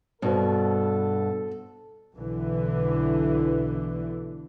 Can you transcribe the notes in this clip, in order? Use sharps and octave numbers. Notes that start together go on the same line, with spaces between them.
G2 B2 B3 F#4 A4 C5
B1 D3 E3